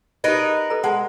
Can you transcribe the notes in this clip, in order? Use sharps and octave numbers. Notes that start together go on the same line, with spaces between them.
D#4 G4 A#4 B4 D#5
A4 B4 A#5
G#3 F#5 A5